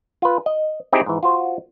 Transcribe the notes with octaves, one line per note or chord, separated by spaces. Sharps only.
F4 B4
D#5
C4 D#4 E4 G4 G#4
G#2 E3
F4 F#4 C5